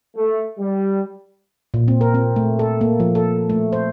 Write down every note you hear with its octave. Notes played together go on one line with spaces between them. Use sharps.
A3
G3
A#2
C4
A#4
C4
A3
A4
A#3
F3
A4
A3
C5